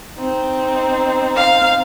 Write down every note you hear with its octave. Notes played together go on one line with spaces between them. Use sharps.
C4 D#4
F5